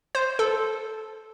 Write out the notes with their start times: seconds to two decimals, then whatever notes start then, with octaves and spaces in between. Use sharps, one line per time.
0.15 C5
0.39 A4